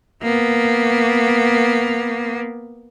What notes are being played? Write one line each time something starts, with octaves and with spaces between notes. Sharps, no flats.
A#3 B3